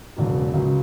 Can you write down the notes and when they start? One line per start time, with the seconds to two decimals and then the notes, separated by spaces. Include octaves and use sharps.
0.16 E1 E2 C#3 F#3
0.54 C#2 C#3 F#3 C#4